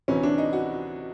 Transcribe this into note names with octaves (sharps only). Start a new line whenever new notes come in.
D2 C3 E3 C#4
D4
D#4
F#4